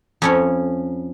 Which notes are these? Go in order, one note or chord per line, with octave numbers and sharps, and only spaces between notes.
F2 C#4 C#5